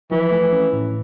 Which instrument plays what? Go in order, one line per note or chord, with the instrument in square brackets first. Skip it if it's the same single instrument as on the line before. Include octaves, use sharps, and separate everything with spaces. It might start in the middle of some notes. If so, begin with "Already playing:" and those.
[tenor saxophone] E3 [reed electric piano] F3
[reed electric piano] A3
C#4
A2